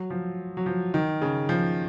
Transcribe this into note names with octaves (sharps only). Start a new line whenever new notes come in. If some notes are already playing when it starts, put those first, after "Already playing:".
Already playing: F#3
F3
F#3
F3
D#3
C#3
F3